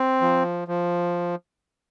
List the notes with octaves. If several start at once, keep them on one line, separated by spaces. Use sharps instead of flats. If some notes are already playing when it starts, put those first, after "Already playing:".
Already playing: C4
F3
F3